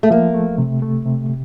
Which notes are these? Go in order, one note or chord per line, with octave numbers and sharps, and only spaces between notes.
A3
F3 A#3
A3
C3
A3
C3
C3